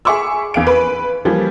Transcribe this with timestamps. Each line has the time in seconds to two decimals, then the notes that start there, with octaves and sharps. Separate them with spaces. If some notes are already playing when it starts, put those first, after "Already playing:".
0.05 G#4 E5 C#6 D6 E6
0.54 E2 F5 D7
0.67 B4
1.25 E3 F3 G3 A#3